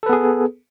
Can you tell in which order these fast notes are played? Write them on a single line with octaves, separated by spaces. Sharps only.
A4 B4 B3 G#4